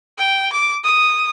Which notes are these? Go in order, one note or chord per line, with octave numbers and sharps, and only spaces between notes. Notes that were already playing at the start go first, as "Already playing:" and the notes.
G5
D6
D#6